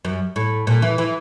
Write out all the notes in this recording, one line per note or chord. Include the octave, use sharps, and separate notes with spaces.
F#2
A2
A#2
E3
E3